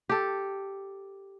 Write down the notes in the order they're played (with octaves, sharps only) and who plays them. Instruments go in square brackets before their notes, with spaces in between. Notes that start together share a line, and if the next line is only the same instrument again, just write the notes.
[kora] G4 A4